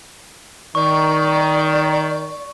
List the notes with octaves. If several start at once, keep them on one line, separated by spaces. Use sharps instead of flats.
D#3 D5 C#6